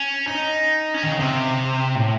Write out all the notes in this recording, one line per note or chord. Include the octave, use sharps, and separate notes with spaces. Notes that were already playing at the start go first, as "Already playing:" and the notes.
Already playing: C#4
D#4
C#4
D#3
C#3
C3
A2